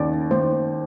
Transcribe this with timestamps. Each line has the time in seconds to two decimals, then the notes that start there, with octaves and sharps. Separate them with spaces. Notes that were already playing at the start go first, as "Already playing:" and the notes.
Already playing: D#2 C#3 D5
0.31 D#2 C5